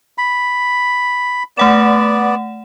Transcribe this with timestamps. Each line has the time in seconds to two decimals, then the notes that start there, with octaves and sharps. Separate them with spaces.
0.18 B5
1.57 A3 B3 D5 F#5 E7